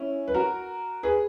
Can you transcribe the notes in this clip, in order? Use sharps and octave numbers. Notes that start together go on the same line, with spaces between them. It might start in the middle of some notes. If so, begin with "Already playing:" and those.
Already playing: C#4 E4
B4
F#4 A#4
G#4 B4